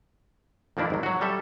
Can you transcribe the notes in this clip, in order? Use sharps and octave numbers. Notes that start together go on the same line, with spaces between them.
F2 D#3 A#3 D4 E4
G#1 F#3
F#3 F#4
G3 A4 E5